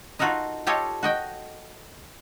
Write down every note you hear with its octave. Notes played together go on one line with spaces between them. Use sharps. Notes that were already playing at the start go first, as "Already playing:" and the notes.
D#4 F4 F#4 A4 A#4 D#5
F4 G4 A4 C#5 D#5
F#4 D#5 G5